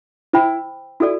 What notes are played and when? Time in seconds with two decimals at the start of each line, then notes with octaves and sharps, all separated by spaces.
0.33 E4 C5 G5 B5
1.00 E4 F#4 A4 D5